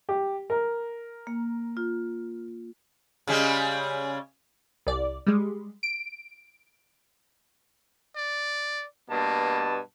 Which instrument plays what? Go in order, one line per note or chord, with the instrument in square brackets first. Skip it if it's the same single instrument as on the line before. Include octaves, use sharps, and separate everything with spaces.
[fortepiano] G4
A#4
[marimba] A#3
F4
[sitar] C#3 G3 G#3
[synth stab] C2 D5
G3 G#3
D7
[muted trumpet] D5
[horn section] G2 B2 A5 [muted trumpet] A#3